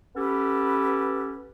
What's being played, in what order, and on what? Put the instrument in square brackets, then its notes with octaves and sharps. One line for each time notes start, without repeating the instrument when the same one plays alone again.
[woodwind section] B3 C#4 G4 A4 B4